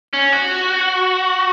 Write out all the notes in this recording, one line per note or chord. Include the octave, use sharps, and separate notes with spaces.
C#4
F#4